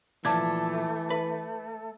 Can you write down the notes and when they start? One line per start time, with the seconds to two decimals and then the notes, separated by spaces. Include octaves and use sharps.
0.25 A#2 E3 F3 A3 A5 D6 G#6
1.10 B4